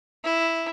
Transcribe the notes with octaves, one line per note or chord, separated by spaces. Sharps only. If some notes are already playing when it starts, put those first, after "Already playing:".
E4